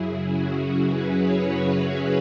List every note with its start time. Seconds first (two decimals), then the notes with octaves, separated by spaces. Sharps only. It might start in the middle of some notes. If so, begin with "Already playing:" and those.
Already playing: F#2 C#3 F#3 E4 G#4
0.23 C#4 F#4
0.55 C#4 F#4
0.86 F#4 B4
1.18 G#4 C#5
1.48 F#4 B4